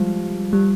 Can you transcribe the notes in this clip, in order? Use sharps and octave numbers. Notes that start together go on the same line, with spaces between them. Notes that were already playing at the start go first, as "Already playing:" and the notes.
Already playing: F3 G3 G#3
G3